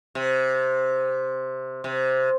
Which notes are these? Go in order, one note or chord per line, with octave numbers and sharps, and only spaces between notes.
C3
C3